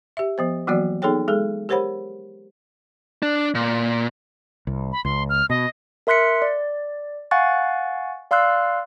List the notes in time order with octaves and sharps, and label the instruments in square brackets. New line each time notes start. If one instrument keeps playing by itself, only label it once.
[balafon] G4 E5
F3 B3 C5
E3 F#3 A#3 B3 F#4 D5
B3 D#4 G#4 A4 C#5 G5
G#3 G#4 A4
G4 A#4 C5 C#5 F#5 B5
[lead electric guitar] D4
A#2
[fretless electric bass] C2
[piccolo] B5
[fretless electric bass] C#2 [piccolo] C6
[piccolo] F6
[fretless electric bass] B2 [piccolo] D#5
[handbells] A#4 E5 C6 F#6 B6 C#7
D5
F5 F#5 G#5 C#6 F#6 A6
D5 F5 C6 E6 F#6